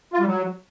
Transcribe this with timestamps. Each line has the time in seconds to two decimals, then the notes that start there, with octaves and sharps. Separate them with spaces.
0.13 F4
0.20 G3
0.27 F#3